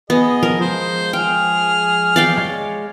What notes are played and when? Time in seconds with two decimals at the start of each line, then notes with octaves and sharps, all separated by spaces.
0.10 B3 G#4 D#5
0.43 F3 A#4
0.61 F3 G#3 C5
1.13 G#4 G5 F6
2.16 D5 F5 G5
2.38 G#3 C#5